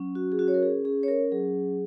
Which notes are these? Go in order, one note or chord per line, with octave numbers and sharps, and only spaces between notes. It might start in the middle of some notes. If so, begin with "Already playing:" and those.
Already playing: F#3 C#4
F#4
G#4
C#4 F#4
C#5
A#4
G#4
C#4 G#4
C#5
A#4
F#3 G#4